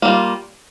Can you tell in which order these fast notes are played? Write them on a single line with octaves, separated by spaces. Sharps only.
A#3 G3 F4